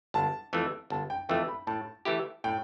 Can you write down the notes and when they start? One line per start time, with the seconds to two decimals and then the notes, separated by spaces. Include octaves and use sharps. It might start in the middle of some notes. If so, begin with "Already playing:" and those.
0.14 G1 A5
0.53 F2 E3 A3
0.90 G1 A5
1.10 G5
1.29 F2 E3 A3 G5
1.48 B5
1.67 A2 A5
2.05 E3 A3 E4 G4
2.44 A2 G5